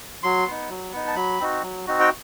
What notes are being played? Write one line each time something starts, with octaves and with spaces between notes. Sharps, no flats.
F#3 C6
B3 D#4
F#3
B3 D#4
A5
F#3 B5
C4 D#4 F#4
F#3
C4 D#4 F#4
G5